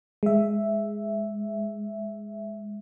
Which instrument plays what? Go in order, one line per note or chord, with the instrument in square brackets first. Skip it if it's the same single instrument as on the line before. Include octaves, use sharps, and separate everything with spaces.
[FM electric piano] G#3 E5